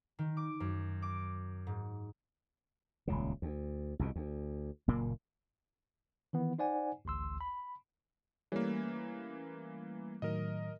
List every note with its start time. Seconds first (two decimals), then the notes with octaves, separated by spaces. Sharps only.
0.19 D#3
0.37 D6
0.60 F#2
1.02 D6
1.67 G#2
3.07 D#1 C#2 C#3
3.42 D2
3.99 C2 F2 B2
4.16 D2
4.88 F#1 A#2 A#3
6.33 D#3 E3 B3
6.59 D#4 C5 D5 F#5 G#5
7.05 A1 D2 C6 E6
7.41 B5
8.52 E3 G3 A3 A#3 C#4
10.22 A2 D#3 F#3 A#4 D#5